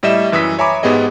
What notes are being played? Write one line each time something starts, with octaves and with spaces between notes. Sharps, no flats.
A2 G3 D#5 E5 E7
F#2 E3 D#6 E6 B6
C#5 E5 G#5 A#5 B5 D6
G#2 B3 G4 G#4 D#5